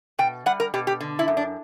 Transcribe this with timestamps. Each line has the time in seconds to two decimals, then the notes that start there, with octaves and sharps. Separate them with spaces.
0.19 B2 G5
0.46 G3 F#5
0.60 A#4
0.74 B2 G4
0.87 G4
1.01 D3
1.19 E4
1.28 F#2
1.37 D4